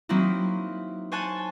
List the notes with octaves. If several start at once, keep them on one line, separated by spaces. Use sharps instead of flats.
F#3 A#3 C4 D#4 E4
C5 C#5 G#5 A5 F#6